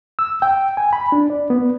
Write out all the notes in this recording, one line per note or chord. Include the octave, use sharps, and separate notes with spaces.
E6
G5
G#5
B5
D4
D5
B3